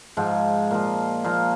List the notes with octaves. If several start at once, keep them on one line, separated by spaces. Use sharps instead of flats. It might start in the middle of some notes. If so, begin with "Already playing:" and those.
G#2 F3
A#2 F3
A#2 F3